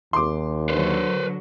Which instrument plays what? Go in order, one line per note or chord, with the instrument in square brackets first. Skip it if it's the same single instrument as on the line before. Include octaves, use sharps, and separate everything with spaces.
[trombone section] D#2 [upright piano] C6 D6
[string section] D3 F#3 [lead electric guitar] B4 C5